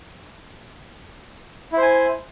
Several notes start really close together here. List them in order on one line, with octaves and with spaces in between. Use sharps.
E4 C5 G#5